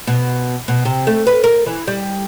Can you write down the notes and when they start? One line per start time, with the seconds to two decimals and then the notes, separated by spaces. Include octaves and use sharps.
0.07 B2
0.68 B2
0.85 C3
1.07 A3
1.27 B4
1.44 A#4
1.66 E3
1.87 G3